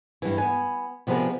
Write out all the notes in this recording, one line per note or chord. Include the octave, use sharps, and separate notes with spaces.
G2 E3
B3 G#5
C3 F3 B3 D4 G#4 A#4